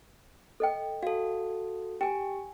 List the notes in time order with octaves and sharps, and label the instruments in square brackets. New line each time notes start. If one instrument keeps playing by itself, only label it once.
[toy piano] A4 D#5 G5
[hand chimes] F#4 A4 [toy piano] F5
[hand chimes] G4 [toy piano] G5 G#5